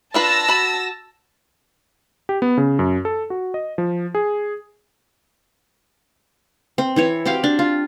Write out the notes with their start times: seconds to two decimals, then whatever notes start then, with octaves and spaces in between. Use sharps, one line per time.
0.14 D4 F4 B4 A5 E6 A#6
0.48 F#4 B5
2.29 G4
2.42 B3
2.57 C#3
2.79 F#2
3.05 A4
3.30 F#4
3.54 D#5
3.78 F3
4.15 G#4
6.78 C4
6.96 E3 E4 C#5
7.26 C4 F#4 G4 F5
7.44 D4
7.59 F4